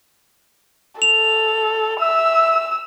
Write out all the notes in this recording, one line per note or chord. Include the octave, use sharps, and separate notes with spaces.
A4 F7
E5 E6